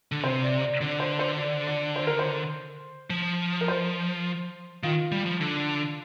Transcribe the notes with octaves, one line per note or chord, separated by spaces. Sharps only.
D3
C3 C5
D5
D5
D3 D5
C5
C5
D5
D5
C5
A#4
C5
F3
A#4
C5
D#3 F4
G3
F3
D3